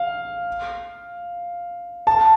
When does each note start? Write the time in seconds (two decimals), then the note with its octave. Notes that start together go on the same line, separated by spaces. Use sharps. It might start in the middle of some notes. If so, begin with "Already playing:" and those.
Already playing: F5
2.07 A5